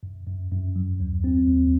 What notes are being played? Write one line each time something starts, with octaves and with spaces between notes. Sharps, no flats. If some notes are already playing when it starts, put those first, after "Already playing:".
F#2
F#2
F#2
F#3
D#2
C4
D#2